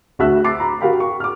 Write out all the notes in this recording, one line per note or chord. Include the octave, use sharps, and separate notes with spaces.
D2 F#4 E5 E6 F#6
C6 D6 A6 C7
A#5 B5
F#4 G4 A#4 F5 G5 B5
C#6
D6 F6